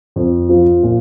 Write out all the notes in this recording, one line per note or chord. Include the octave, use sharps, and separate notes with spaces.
F2
F3
A#2